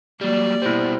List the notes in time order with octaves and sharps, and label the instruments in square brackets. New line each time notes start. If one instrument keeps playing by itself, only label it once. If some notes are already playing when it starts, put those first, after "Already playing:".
[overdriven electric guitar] F#3 G3 [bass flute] A#3 [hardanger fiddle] D5
[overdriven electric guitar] B2 G3 [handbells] E4 C5